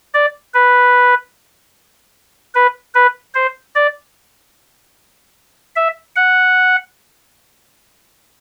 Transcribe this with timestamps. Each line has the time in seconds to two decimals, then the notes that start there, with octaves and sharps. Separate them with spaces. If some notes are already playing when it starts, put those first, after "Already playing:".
0.14 D5
0.54 B4
2.55 B4
2.95 B4
3.34 C5
3.75 D5
5.76 E5
6.16 F#5